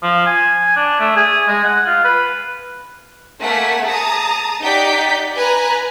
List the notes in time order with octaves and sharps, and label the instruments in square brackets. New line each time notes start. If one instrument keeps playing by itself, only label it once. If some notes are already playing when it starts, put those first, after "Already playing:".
[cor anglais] F3
G#5
D4
A3
G#4
G#3
F#5
F4
B4
[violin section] A3 A#3 F#5 G#5 B6
G#4 A5 A#5 D#6
D#4 G4 D5 F#5 G6 B6
B4 G#5 A#5 F#6